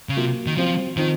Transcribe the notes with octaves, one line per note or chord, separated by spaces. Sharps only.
C#3
C3 F#3 A#3 F4
D#3
F3 F#3 C4 F4
D#3 F3 C4 D#4